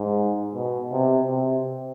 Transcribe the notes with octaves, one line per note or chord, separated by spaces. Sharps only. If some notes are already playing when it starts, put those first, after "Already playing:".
Already playing: G#2
B2
C3
C3